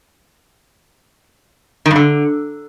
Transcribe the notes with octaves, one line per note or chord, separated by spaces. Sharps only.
D#3
G2
D3